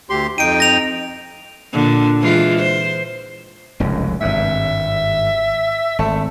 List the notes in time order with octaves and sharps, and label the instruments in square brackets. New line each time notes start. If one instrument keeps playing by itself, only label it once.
[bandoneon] D2 G4 C6
[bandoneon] F2 D#4 G5 [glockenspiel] D7 D#7
[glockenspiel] A#6 F7
[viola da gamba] A#2 D3
E3 G#3 F4
C5
[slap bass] F1 C#2 F#2
[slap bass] G#1 G2 [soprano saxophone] E5
[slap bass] G#1 [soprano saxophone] A3